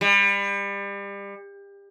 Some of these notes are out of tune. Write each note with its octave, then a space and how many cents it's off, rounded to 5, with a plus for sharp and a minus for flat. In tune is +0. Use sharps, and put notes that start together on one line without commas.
G3 +30